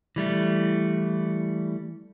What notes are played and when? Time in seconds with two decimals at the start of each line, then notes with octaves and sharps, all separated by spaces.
0.16 E3 G3 A3